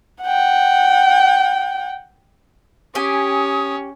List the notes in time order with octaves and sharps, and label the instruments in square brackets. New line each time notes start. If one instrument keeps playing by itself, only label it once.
[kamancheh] F#5 G5
[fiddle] C#4 [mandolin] G4 G#5 [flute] D#6